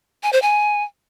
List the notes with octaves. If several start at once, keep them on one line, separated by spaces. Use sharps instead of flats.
G#5
C5
G#5